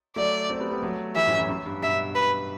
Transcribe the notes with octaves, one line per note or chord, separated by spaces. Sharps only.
F#3 A3 D5
A3 C4
G3 B3
G3 B3
F#3 A3
E3 G3 E5
F#2 A2
F#2
F#2
G2
G2 B2 E5
B4